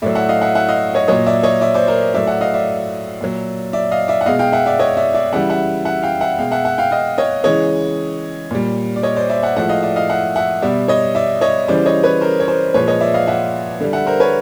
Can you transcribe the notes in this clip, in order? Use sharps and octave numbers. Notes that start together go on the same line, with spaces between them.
A2 F#3 D5 E5
E5 F#5
D#5 F5
E5 F#5
E5 F#5
D#5 F5
C#5 D#5
A#2 F#3 C#5 D#5
D5 E5
C#5 D#5
D5 E5
C5 D5
A#4 C5
A2 F#3 D5 E5
E5 F#5
D#5 F5
D5 E5
A#2 F#3
D5 E5
D#5 F5
D5 E5
F#5
B2 G#3 D#5 F5
F5 G5
E5 F#5
D5 E5
C#5 D#5
D5 E5
D5 E5
C#3 E3 G3 E5 F#5
E5 F#5
E5 F#5
F5 G5
E5 F#5
B2 G#3 F5 G5
E5 F#5
E5 F#5
F5 G5
D#5 F5
C#5 D#5
C#3 E3 G#3 C#5 D#5
A#2 G3
D5
C#5 D#5
C5 D5
D5 E5
E5 F#5
A2 F3 G#3 E5 F#5
D#5 F5
D5 E5
D#5 F5
E5 F#5
E5 F#5
B2 G3 D5 E5
C#5 D#5
D5 E5
C#5 D#5
C#3 E3 G3 C5 D5
C#5 D#5
B4 C#5
A#4 C5
C#5
A#4 C5
A#2 F3 G#3 B4 C#5
C#5 D#5
D5 E5
D#5 F5
E5 F#5
D3 G3
E5 F#5
A#4 C5
B4 C#5